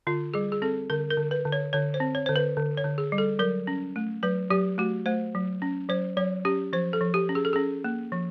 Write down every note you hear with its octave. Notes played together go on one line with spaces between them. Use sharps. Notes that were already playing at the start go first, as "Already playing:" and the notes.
D3 F4
G3 G#4
G#4
C4 A4
D3 A#4
A#4
D3
B4
D3
C#5
D3 C#5
C5
C4
C#5
D3 C5
B4
D3
C#5
D3
G#4
G3
A4
F#3 A#4
C#4
A3
F#3 B4
F#3 G4
A3 F#4
A3 C5
F#3
C#4
F#3 C5
F#3 C#5
C#4 G4
F3 C5
A4
F3
G4
C#4
G#4
A4
C#4 G#4
A#3
F3